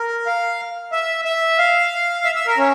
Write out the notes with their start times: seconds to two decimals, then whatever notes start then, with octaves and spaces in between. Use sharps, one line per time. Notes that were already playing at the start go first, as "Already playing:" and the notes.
Already playing: A#4
0.26 F5
0.92 E5
1.25 E5
1.58 F5
2.25 E5
2.35 E5
2.47 A#4
2.58 C#4